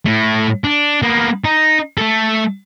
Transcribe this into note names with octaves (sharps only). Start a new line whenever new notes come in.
A2 A3
D4
A#3 B3
D#4
A3 A4